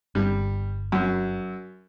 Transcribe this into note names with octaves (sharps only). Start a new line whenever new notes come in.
G1 G3 D4
F#2